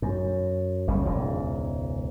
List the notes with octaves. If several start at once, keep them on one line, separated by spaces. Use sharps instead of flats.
F#2
F#1 C#2 C#3 G3
E1 C#2 G#2